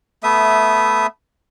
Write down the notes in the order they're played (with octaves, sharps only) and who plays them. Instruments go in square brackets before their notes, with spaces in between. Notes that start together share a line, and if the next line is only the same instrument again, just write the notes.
[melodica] A3 B3 E5 D#6